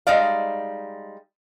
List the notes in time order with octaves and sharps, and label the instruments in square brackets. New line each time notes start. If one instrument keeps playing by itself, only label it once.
[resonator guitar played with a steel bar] G3 G#3 D#4 D5 F5